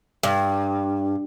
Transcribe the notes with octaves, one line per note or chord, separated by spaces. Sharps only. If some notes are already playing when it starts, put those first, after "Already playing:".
G2